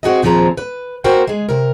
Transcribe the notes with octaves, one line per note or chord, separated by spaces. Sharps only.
C4 F#4 G#4 D#5
D#2 A#2 F3 C4 G#4 A#5
B4
A#3 F#4 A#4 C5 G5 G#5
G#3 G#4
C3 A#4